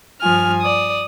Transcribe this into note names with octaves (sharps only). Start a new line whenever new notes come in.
G2 F3 G#5 F6
D5 D#6